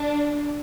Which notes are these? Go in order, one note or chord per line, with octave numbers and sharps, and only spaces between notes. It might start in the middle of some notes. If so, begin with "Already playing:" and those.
Already playing: D4